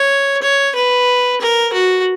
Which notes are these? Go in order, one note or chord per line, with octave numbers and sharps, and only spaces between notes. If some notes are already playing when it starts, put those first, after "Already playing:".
Already playing: C#5
C#5
B4
A#4
F#4